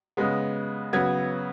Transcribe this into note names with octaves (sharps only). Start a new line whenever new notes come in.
C#3 G#3 B3
C#3 F#3 B3 G#6